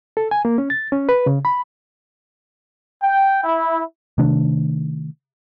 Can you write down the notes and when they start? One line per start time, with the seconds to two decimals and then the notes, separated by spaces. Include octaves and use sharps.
0.17 A4
0.31 G#5
0.45 A#3
0.58 C#4
0.70 A6
0.92 C#4
1.09 B4
1.26 C#3
1.45 B5
3.03 G5
3.44 E4
4.18 C3 D#3 A3 D4